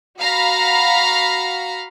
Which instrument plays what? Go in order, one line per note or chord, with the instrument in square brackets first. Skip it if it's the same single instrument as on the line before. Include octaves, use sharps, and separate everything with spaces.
[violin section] F#4 F5 A#5 B5